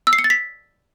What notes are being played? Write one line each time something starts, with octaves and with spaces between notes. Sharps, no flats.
E6
C7
C#7
A6
B6